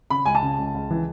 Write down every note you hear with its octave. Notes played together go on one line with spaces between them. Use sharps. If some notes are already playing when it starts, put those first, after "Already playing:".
C#3 B5
C#2 G#5
A5
C#3
C#2
C#2
E3